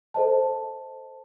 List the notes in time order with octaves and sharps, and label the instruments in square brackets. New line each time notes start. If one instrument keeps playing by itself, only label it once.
[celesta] A4 C5 D#5 A5